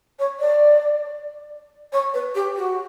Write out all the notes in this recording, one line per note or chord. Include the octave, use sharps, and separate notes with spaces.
C#5
D5
C#5
B4
G4
F#4